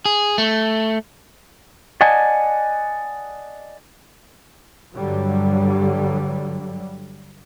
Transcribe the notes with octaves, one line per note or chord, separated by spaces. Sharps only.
G#4
A3
D5 D#5 F#5 G#5 A5
G2 D3 F#3 G3